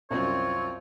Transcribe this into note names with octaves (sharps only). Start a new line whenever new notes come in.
C2 F#2 C4 F4 C#5